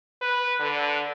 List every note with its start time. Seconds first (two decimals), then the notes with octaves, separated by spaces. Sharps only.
0.21 B4
0.60 D3